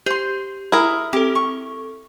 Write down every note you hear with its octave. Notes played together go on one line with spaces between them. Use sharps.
G4 C5 C6
E4 G#4 A#4
C4 G4 A4
C#6